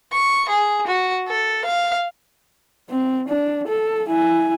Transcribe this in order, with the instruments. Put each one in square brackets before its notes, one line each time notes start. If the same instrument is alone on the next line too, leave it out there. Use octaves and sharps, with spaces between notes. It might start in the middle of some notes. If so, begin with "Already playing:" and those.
[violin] C#6
G#4
F#4
A4
F5
[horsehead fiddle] C4
D4
A4
E4 G#5